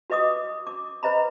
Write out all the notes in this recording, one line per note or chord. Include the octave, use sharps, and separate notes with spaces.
F#4 B4 D#5 D6 D#6
D6
B4 C5 D#5 A#5 B5